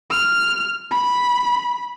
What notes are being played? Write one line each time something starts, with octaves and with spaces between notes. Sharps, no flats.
F6
B5